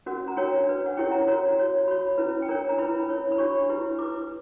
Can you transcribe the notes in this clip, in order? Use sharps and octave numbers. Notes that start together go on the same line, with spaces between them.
C#4 F#4 A#4 F#5
A#5
D4 F#4 A#4 C#5 G5
D4 F#4 B4
F#5
C#4 E4 G4 A#4 C#5 G5
A#5
F#4 A#4 C#5 A#5
F#4 C#5
F#4 C#5 B5
C#4 E4 B4
G5
D4 A#4 C#5 A#5
A#5
E4 B4 B5
C#4 E4 A#4 C#5
B5
D4 F#4 C#5 C#6
E4 G4 B4
E4 B4 D6